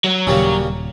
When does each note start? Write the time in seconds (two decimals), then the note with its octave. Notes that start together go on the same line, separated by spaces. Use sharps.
0.04 F#3
0.27 D#1 C#3 G3 A#3